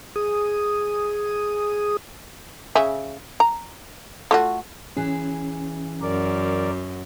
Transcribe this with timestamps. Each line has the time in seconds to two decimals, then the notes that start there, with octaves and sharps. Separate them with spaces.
0.16 G#4 D#6
2.75 C#3 E5 G#5
3.40 A#5
4.31 A3 F4 F#4
4.97 E3 C#4 G#4
6.02 F#2 A#4 D5